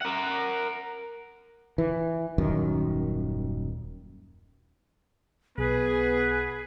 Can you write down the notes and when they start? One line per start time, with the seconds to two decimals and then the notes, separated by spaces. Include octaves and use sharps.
0.01 A#4 F#5
1.78 E3
2.38 D#1 F#2 D#3
5.58 B1 B3 G#4 B4